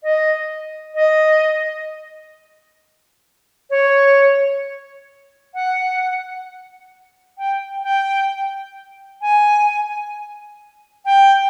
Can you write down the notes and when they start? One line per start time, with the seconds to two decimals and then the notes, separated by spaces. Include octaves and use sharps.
0.03 D#5
0.95 D#5
3.70 C#5
5.54 F#5
7.38 G5
7.83 G5
9.21 G#5
11.05 G5